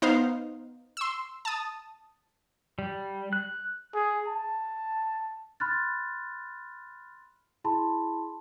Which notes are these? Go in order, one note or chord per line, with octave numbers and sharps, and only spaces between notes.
B3 D#4 C5 F5
C6 E6
A5 D#6
G3
F#6
G#4
A5
B5 C6 F6 F#6 A6
E4 G#4 A5 B5 C6